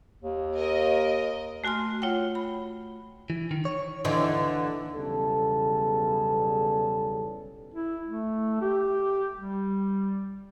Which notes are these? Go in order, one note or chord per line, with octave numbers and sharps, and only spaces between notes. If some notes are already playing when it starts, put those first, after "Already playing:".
D#2
A#4 D#5
A3 F#4 G#5 C6 F6
F4 C#5 F#5 G5
B5
E3
D#3
C#5
D#2 D3 E3
B1 E2 C#3 G3 A4
E4
A3
G4
G3